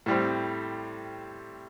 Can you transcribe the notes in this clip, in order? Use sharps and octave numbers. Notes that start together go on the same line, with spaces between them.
A2 G3 C4